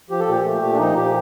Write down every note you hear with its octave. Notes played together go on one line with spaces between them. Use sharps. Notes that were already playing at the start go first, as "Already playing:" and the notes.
F3 G4
A4
A#2 G4
A3
A#2 G4
D4
F3 D#4
A#2 G4